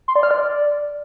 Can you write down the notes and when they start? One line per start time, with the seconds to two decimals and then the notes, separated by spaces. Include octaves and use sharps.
0.08 C6
0.16 D5
0.23 F6
0.31 D5